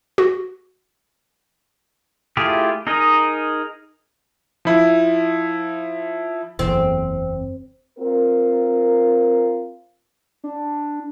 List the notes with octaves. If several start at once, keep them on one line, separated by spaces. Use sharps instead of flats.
F#4
A3 E4 F4 G4 G#4
D#4 G#4 A#4 D#5
F3 E4
F#1 E2 C4
C4 F4 A#4
D4